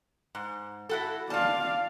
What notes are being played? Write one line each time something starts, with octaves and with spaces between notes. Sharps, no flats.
G#2
E4 F#4 A4
F4 D5 F5 A5